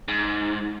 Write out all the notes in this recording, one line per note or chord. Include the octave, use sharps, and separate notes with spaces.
G#2